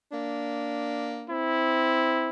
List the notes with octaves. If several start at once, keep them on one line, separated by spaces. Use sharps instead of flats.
A#3 D4
C4 E4